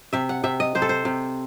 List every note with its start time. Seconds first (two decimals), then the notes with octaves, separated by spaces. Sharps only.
0.13 C3 E5
0.29 F#5
0.44 C3 E5
0.60 D#5
0.75 C3 C5
0.82 A4
0.89 C5
1.05 C3